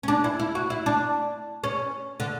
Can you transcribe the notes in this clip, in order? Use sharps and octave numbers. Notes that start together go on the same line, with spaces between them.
C#4
D4
E4
E4
F#4
E4
D4
C#4
D3